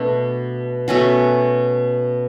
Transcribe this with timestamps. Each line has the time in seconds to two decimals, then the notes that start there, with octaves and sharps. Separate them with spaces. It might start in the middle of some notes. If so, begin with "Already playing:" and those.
Already playing: B2 A3 D4
0.88 B2 A3 C#4 F#4